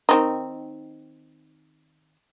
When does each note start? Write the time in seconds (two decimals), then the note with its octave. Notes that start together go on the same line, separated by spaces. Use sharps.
0.09 D#3 C4 D#4